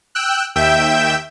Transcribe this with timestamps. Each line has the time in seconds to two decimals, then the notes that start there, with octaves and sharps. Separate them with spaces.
0.15 G5 E6 F#6
0.55 D#2 E5 G5 G6 E7